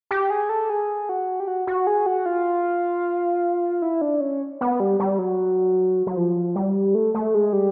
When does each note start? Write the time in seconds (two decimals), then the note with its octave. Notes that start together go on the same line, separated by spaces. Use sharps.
0.11 G4
0.30 G#4
0.49 A4
0.70 G#4
1.09 F#4
1.40 G4
1.48 F#4
1.67 F#4
1.87 G#4
2.06 F#4
2.26 F4
3.82 E4
4.01 D4
4.21 C#4
4.61 B3
4.80 G3
5.00 G3
5.19 F#3
6.07 F#3
6.17 F3
6.56 G3
6.95 A3
7.14 A3
7.35 G#3
7.53 G3